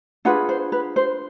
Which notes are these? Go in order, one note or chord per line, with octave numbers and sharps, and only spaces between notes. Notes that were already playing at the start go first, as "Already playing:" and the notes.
D4 F4 G#4 B4 F#5
C5
B4
C5